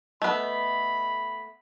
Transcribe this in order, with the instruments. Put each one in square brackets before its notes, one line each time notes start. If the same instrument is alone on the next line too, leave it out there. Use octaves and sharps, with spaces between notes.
[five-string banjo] A3 B3 [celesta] D#5 [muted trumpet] B5